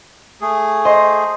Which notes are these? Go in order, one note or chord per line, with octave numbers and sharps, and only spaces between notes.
A3 G#4
C5 D#5